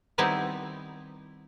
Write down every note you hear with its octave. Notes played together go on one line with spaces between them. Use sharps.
D#3 G3 B3 C4 D#4 E4